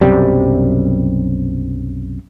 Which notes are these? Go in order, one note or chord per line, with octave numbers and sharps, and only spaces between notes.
B1 F#2 C3 G3